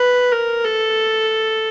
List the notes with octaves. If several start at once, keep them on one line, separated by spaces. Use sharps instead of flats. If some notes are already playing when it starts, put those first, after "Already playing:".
Already playing: B4
A#4
A4